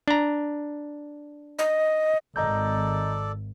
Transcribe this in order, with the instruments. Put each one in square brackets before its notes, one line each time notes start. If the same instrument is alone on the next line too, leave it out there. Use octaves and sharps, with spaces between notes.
[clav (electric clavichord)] D4 A#5
[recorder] D#5
[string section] G#1 [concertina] A4 D5 [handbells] D#5 A#5 G6